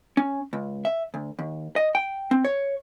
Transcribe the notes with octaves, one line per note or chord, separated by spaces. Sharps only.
C#4
C#2
E5
D2
D#2
D#5
G5
C4
C#5